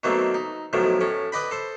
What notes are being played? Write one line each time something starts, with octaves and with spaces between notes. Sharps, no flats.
B2 D#3 F#3 A3 A#3 C4
D#4
B1 A2 D#3 F3 F#3
A2 C#4
B4 D5 D#5 G5 B5
A4 C5